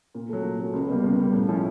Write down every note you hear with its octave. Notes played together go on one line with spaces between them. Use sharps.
A#2
F#3 A3
A#2
F#3 A3
C#2
B2 G3 A#3
C#2
B2 G3 A#3
A2
F3 G#3 C#4 E4